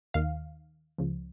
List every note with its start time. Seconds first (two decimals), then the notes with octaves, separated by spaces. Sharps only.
0.14 D#2 D#3 F5
0.98 C#2 C#3 F3